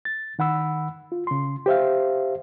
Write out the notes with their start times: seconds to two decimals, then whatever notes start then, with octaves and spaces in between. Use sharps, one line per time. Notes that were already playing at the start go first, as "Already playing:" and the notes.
0.05 A6
0.39 D#3 F#5 B5 E6
1.12 F4
1.27 C#3 C6
1.66 G4 C5 E5 F5